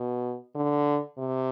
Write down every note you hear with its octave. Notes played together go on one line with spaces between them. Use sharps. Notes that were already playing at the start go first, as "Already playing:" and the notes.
Already playing: B2
D3
C3